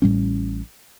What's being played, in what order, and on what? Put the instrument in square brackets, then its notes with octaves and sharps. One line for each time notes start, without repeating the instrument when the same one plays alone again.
[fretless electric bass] A1 A2 G3 C#4